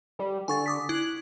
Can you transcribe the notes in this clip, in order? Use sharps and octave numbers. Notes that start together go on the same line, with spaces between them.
G3
D3 G#5 C#6 A6
D6 D#6 B6
E4 F#6